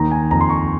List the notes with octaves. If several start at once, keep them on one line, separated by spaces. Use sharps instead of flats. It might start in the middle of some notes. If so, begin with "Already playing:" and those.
Already playing: D#2 D#3 A#5
G#5
F2 A#5
C6
C#6